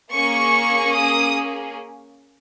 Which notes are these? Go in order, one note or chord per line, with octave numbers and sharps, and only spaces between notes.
A#3 C#4 G#4 C#6
D#6